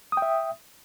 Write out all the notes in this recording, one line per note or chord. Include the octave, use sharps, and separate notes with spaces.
E5 G5 D#6